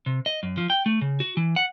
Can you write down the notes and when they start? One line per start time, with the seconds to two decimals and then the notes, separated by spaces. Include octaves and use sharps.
0.06 C3
0.26 D#5
0.43 F#2
0.58 F3
0.70 G5
0.86 A3
1.01 C#3
1.20 F#4
1.37 E3
1.56 F#5